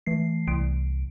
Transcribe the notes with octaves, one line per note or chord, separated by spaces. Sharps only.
E3 A3 C7
C2 D7